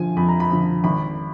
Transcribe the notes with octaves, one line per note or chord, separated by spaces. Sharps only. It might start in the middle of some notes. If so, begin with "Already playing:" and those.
Already playing: D3 F3 G#5
F2 B5
A#5
B5
D3 F3
G#1 B5